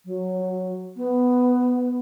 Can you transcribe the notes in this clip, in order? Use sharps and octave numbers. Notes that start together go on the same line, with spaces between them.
F#3
B3